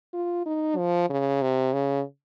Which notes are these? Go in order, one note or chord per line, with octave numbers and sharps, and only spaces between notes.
F4
D#4
F3
C#3
C3
C#3